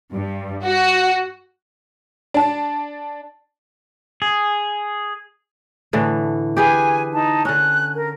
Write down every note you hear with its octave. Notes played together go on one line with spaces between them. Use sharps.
G2
F#4
D4 A5
G#4
A2 D3 E3
G4 G#4 B4 G#5
D#4 A5
D3 C#4 F#6
A#4